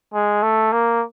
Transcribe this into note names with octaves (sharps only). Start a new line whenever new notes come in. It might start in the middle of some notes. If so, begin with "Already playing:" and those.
G#3
A3
A#3